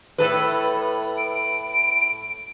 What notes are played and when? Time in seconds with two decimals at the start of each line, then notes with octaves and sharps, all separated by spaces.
0.18 A2 A4 B4
1.18 D7